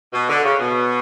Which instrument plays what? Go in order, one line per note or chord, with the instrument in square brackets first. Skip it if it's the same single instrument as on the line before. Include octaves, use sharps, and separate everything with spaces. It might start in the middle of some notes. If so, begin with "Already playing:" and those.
[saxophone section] B2
D3
C#3
B2